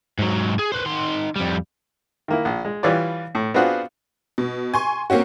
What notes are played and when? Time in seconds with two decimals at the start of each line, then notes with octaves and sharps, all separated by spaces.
0.19 G#2 F#3
0.59 G#4
0.72 B4 C5
0.86 D#3 C6
1.36 F2 G3
2.28 D#3 A#3 E4
2.45 A#1
2.65 G#3
2.83 E3 G3 F4 B4 C#5 D5
3.35 A2
3.54 B3 C4 D4 F4 F#4 G#4
4.38 B2
4.74 G#5 C6 C#6
5.10 A#3 C4 C#4 F#4